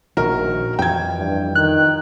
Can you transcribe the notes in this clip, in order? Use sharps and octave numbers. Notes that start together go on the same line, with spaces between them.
A#1 D#3 F#4 A#4
F2 E3 G5 G#6
G2
D#3 F#6